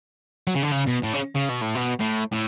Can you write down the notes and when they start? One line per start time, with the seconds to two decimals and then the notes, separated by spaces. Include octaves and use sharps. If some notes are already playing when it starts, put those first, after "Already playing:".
0.47 F#3
0.55 C#3
0.63 D3
0.72 C#3
0.87 B2
1.04 A2
1.14 C#3
1.36 C#3
1.49 B2
1.62 A2
1.75 B2
2.00 A2
2.32 A2